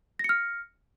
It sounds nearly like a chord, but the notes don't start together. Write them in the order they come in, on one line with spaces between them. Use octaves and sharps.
A#6 C#7 F6